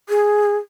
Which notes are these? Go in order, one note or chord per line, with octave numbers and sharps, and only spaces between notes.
G#4